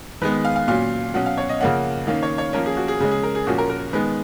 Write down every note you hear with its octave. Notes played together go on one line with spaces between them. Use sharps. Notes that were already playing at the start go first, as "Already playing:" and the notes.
D#3 G#3 B3 B4
F5
F5
A#2 F#3 C#4 F5
B2 F#3 C#4 F#5
F5
C#5
D#5
C#3 F3 A#3 C#4 F#5
D#3 A#3 C#4 F5
C#5
C#5
F3 A#3 C#4 A#4
G#4
F#4
G#4
C#3 G#3 C#4 G#4
G#4
A#4
G#4
A#2 F3 A#3 C#4 F#4
A#4
A#4
D#3 G#3 B3 B4